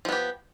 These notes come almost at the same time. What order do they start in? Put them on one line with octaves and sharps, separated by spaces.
F3 B3 G4